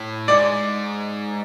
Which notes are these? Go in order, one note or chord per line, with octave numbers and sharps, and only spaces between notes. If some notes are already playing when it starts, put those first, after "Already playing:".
Already playing: A2
G#2 D5